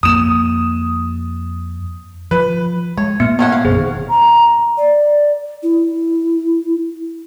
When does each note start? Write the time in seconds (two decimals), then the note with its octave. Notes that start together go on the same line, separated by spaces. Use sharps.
0.03 F2 A#3 D#6 E7
2.31 F3 B4
2.97 G#3 C#5
3.20 A#2 B3 F6
3.39 D#3 C#4 F#5
3.52 F5
3.65 F#1 G2 C3 G#4 C5
3.77 D#3
4.10 A#5
4.78 D5
5.63 E4